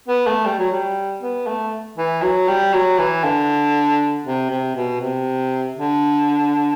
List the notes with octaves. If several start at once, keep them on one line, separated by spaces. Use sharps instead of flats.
B3
A3
G3
F#3
G3
B3
A3
E3
F#3
G3
F#3
E3
D3
C3
C3
B2
C3
D3